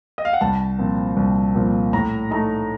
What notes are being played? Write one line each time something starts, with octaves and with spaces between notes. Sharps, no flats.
D#5
F5
F#5
C2 A5
A#2 F3 C4
C2
A#2 F3 C4
A2 A#5
A3 D#4 A#5